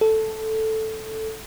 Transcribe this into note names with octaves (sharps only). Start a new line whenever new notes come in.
A4